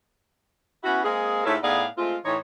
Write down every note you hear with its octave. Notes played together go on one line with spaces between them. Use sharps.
B3 C#4 E4 F#4
G#3 A#3 C4 G#4
G#2 A3 E4 F4 A4 C#5
A2 B3 D#4 G#4 D5 F5
G#3 A3 C4 F4
A2 E3 D#4 C5 C#5